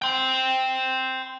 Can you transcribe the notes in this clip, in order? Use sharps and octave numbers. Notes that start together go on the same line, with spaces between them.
G5 C6